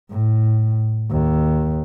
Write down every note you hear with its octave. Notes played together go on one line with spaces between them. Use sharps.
A2
D#2